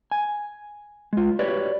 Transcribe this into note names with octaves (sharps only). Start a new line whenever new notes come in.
G#5
G#3 F4
F#4 G4 B4 C#5 D5